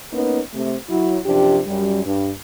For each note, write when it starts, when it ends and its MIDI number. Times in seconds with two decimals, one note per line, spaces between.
0.12 0.40 58
0.12 0.40 59
0.12 0.40 61
0.12 0.40 63
0.12 0.40 71
0.53 0.74 48
0.53 0.74 57
0.88 1.18 54
0.88 1.18 64
1.26 1.59 42
1.26 1.59 48
1.26 1.59 53
1.26 1.59 62
1.26 1.59 67
1.66 2.04 42
1.66 2.04 55
2.05 2.30 43